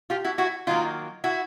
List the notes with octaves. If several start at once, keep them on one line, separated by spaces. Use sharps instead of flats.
F4 G4
E4 F#4
E4 F#4
D#3 F#3 A#3 D#4 F4
E4 F#4